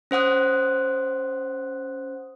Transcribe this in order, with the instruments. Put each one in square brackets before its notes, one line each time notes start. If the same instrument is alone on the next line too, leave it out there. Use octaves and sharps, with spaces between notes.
[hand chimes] C#4 C5 F#5 D#6 F#6